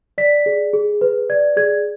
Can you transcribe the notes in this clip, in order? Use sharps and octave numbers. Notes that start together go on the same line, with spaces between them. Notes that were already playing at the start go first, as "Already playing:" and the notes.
D5 B6
G#4
G#4
B4
D5 G#6
G#4 G#6